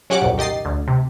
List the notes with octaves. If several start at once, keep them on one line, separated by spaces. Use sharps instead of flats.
F#3 C#4 F#4 G4 F#5 D6
C2 F2 A#2
D#3 G4 D#5 A6 C7
D2
C3